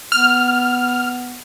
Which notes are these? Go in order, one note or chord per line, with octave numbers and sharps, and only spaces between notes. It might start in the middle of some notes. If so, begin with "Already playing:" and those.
B3 F6